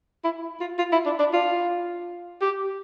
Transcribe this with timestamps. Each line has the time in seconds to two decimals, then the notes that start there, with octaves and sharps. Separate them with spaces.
0.24 E4
0.61 F4
0.79 F4
0.92 E4
1.06 D4
1.19 D4
1.33 F4
2.42 G4